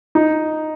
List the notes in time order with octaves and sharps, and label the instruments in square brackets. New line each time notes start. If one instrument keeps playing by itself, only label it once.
[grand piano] D#4